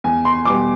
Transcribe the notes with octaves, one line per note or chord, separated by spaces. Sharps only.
E2 G#5
C6
B2 G3 B3 D6